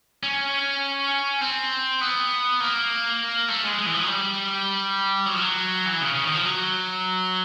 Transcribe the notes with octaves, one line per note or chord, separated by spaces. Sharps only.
C#4
C4
B3
A#3
A3
G#3
G#3
E3
F3
F#3
G3
F#3
F3
F#3
E3
C#3
C#3
D#3
F3
F#3